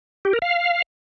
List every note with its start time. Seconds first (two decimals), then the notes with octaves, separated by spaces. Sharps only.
0.25 G4
0.33 A#4
0.42 F5